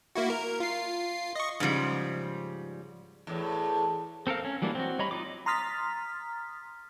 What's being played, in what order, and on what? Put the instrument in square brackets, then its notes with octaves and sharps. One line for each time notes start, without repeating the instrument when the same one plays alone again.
[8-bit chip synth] A#3 E4 F#4
A#4
F4 C7
D#5 C#6
[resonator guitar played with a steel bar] G#2 C#3 F3 G3
[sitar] E2 A2
[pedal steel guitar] C4 A4 A#4 F5
C#4
E3 F#3 G3 A#3 D4
C4 F#4
G3 C#5 D#5 A#5 B5
D#4 F4 D6
[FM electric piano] A#5 C6 D#6 F6 A6 B6